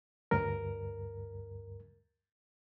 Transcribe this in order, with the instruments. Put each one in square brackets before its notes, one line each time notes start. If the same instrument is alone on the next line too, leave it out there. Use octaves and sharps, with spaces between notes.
[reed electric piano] D2 G2 A#4